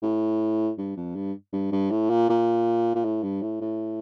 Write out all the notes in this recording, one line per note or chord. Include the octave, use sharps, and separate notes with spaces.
A2
G2
F2
G2
G2
G2
A2
A#2
A#2
A#2
A2
G2
A2
A2